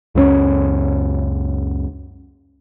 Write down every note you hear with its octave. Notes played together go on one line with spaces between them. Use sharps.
C#2 F#2 C4 C#4